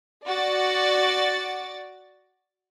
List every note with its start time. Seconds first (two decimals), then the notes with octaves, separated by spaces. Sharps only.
0.25 F#4 D5 A6